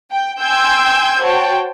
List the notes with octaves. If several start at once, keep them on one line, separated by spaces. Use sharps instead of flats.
G5
G5 G#5 C6 E6 G6 G#6
F#4 C5 C#5 G5 A5